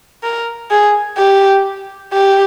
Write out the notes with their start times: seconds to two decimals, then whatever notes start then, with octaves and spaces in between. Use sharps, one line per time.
0.23 A#4
0.71 G#4
1.18 G4
2.13 G4